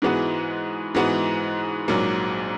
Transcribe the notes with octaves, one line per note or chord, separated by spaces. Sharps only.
G#2 E3 G#3 B3 F#4
G#2 E3 G#3 B3 F#4
A#1 G#2 F#3 A#3